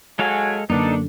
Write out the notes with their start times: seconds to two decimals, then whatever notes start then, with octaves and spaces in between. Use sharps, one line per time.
0.19 F#3 G#3 A4 F5 G#5
0.70 F#2 D3 A#3 B3 D4 D#4 A4